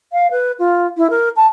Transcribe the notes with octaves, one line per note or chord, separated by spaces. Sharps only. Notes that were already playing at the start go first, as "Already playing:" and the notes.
F5
B4
F4
E4
A#4
A5